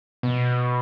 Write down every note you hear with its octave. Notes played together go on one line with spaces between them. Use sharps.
B2